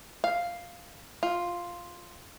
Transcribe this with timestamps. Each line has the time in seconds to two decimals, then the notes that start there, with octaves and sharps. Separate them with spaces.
0.24 F5
1.23 F4